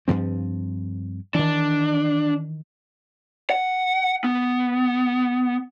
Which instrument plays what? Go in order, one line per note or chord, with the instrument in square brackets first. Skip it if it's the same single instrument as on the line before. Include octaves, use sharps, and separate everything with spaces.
[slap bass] G2 F3 C4
[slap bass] D#3 E3 [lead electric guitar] D4
[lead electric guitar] F#5
B3